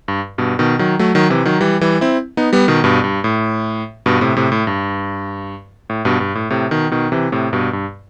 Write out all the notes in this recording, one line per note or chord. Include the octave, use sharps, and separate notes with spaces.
G2
G2 B2
B2 D#3
D#3 F#3
F#3 A3
D#3 F#3
C3 E3
D#3 F#3
E3 G3
E3 G3
C4 E4
B3 D#4
G3 B3
B2 D#3
G2 B2
G2
A2
G2 B2
A2 C3
A2 C3
A2
G2
A2
G2 B2
G2
A2
A2 C3
B2 D#3
B2 D#3
C3 E3
A2 C3
G2 B2
G2